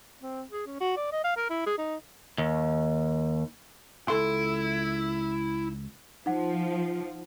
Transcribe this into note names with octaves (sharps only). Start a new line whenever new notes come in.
C4
G#4
C#4
F#4
D5
D#5
F5
A#4
E4
G#4
D#4
D#2
C#2 E4 A4 C6
F3 D#4 F#5